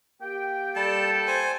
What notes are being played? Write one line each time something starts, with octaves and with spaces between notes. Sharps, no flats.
A#3 G4 G5
G3 A4 A5
C5 G#5